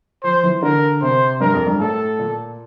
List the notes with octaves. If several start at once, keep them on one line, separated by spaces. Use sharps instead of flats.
F3 C5
E3
D3 A#4
C3 C5
G2 A#4
F2
G2
A2 A4
A#2